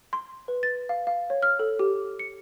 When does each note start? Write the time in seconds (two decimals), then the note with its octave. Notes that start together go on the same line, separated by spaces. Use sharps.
0.13 C6
0.48 B4
0.63 A6
0.89 F5
1.07 F5
1.30 C#5
1.43 F6
1.59 A4
1.79 G4
2.19 C#7